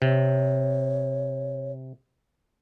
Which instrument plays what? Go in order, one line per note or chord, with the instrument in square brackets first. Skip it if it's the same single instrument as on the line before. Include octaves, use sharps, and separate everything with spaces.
[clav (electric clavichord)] C3 [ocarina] C#5